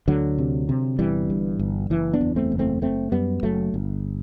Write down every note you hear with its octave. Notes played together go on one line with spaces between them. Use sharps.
D2 D3 F#3
C3
C3
G1 E3 G3
G2
G1
F#1 E3
B3 D4
E2
A3 C4
F#1
A3 C4
F#1 A3 C4
F#2 G3 B3
F#1 F#3 A3
G1